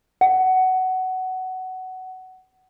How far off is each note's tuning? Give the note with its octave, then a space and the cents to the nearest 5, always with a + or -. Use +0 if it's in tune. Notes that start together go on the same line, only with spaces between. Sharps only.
F#5 +15